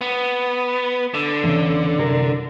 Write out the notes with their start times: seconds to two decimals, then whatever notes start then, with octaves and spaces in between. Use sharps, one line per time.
0.01 B3
1.14 D3
1.44 E2 C#3
1.98 C2 F#2 A#4